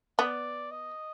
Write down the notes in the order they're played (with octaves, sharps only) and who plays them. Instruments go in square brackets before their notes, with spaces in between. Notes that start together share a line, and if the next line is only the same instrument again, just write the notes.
[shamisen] B3 [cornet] D5
[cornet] D#5